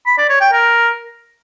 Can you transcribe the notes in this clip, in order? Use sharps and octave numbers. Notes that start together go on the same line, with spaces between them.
B5
D5
C#5
G5
A#4